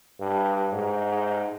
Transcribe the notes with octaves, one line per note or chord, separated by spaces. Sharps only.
G2
G#2